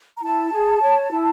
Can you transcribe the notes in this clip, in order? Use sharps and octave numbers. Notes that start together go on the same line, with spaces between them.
A#5
E4 A5
G#4
C#5
E4